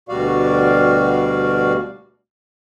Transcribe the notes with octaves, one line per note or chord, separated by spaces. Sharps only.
D2 B2 G3 F#4 D5 F5